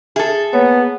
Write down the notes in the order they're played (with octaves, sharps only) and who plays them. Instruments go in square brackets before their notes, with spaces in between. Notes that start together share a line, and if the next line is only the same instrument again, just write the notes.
[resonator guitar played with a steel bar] G#4 A4 [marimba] E5
[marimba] A#3 C#5 [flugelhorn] B3